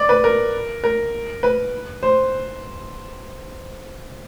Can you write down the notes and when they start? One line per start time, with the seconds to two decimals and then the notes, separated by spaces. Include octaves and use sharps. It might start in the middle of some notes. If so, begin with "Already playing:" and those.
Already playing: D5
0.09 B4
0.24 A#4
0.84 A#4
1.43 B4
2.03 C5